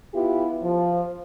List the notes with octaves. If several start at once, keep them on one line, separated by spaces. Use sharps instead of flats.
B3 E4 F4 G4
F3